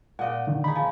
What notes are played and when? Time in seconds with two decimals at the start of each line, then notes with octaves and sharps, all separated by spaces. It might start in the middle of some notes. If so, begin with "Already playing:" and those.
0.19 A#2 D#5 F#5 G5
0.47 D3 D#3
0.64 D#4 G#4 B5
0.75 F3